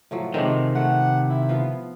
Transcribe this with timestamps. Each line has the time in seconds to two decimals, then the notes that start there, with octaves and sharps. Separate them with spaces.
0.11 A2 F3 F#3
0.34 C3 D#3 G#3 A3 C4 A#4
0.75 A3 F#5
1.29 E4
1.49 F3 B3 F4